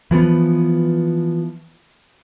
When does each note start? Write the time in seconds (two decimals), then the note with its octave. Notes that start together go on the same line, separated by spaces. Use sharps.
0.11 E3 F3 A3 B3